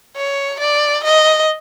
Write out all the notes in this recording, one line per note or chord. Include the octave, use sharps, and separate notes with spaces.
C#5
D5
D#5